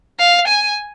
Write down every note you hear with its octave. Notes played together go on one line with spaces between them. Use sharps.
F5
G#5